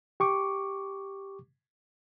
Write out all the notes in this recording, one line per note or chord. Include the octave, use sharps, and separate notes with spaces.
G4 C#6 D6